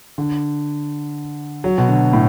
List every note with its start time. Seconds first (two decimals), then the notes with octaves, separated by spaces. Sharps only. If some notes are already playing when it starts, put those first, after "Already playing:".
0.18 D3
1.64 F#3
1.78 B2
1.88 D3
2.13 A2